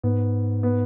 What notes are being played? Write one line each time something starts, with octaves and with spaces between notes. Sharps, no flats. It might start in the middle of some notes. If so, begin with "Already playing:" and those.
G#2 B3
B3